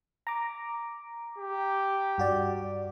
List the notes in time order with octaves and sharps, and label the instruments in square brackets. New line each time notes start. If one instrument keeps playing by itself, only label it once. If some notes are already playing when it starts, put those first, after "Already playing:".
[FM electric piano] A#5 D6
[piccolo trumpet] G4
[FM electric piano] G2 F#4 D5